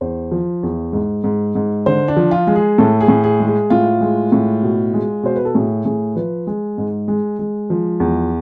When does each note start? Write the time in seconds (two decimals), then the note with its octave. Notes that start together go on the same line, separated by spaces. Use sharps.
0.01 E2 C5
0.31 F3
0.63 E2
0.93 G#2
1.24 G#2
1.55 G#2
1.86 D3 C5
2.08 D4
2.16 F3
2.31 F4
2.47 G#3
2.55 G#4
2.78 A2 A4
3.01 G#4
3.08 A2
3.24 G#4
3.40 G#3
3.47 G#4
3.70 A2 F4
4.01 G#3
4.32 A2
4.63 B2
4.94 G#3
5.23 B2 C5
5.36 B4
5.45 A4
5.54 A2 G#4
5.85 A2 G#4
6.16 F3 B4
6.47 G#3
6.78 G#2
7.08 G#3
7.39 G#3
7.70 F3
8.00 E2